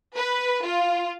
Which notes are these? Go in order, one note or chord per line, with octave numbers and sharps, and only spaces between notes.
B4
F4